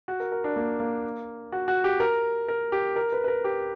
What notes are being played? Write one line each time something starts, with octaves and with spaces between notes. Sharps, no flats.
F#4
A#4
A#4
D4
A#3
A#3
F#4
F#4
G4
A#4
A#4
G4
A#4
B4
B4
A#4
G4